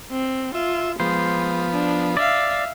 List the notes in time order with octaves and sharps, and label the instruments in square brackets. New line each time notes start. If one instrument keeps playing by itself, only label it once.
[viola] C4
[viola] F4 [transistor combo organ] E5
[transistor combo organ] F3 B3 [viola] G#3 [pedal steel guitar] C5
[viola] D4
[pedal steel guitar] D5 [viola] E5 F5